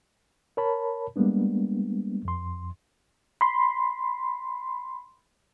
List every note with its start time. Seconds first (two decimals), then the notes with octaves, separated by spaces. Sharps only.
0.57 A#4 C#5 A5 B5
1.16 G3 G#3 A#3 B3 D4
2.25 F2 C6
3.41 B5 C6